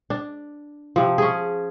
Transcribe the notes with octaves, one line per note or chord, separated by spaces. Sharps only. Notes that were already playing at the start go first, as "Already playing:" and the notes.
D4
C3 F3
C#4 G#4